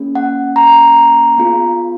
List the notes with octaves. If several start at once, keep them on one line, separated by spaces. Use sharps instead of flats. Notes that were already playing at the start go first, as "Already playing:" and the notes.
Already playing: A#3 C#4 G#4
F#5
A#5
B3 F4 G#4